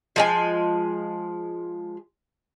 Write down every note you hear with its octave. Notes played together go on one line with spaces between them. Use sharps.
F3 G#3 G#5